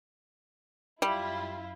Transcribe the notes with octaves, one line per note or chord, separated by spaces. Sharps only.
F#2 G3 E4 F4